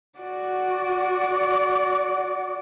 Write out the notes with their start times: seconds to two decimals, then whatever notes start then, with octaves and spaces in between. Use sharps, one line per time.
0.19 F#4 D5